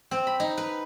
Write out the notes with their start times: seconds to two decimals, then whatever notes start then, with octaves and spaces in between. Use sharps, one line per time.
0.11 C4
0.27 B5
0.40 D#4
0.57 B4